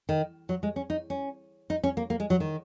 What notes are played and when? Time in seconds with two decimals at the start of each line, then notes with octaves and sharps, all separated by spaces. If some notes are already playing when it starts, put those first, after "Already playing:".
0.09 D#3
0.49 F#3
0.63 G#3
0.76 C#4
0.90 D#4
1.10 C#4
1.70 D#4
1.83 C#4
1.97 A#3
2.10 A#3
2.20 G#3
2.30 F#3
2.40 D#3